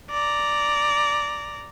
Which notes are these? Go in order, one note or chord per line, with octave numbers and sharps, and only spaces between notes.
D5 A#5